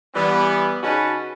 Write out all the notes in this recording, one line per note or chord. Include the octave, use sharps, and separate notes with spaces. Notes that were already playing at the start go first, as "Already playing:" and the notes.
E3 G3 B3
C#3 C#4 D#4 F#4 B4 A5